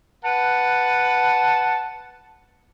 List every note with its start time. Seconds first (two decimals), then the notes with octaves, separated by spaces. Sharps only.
0.25 B4 F#5 A5